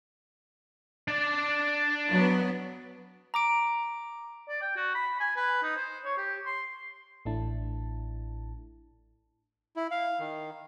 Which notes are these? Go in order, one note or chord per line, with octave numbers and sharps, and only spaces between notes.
D4 D5
F#3 B3
A#5 D6 D7
D5
G5
F#4
B5
G#5
B4
D#4
C5
C#5
G4
C6
A1 A2 A3 D4 E4 A5
E4
F5
D#3